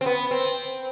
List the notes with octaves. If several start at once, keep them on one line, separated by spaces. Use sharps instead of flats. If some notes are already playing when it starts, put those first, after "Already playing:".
C4
B3
C4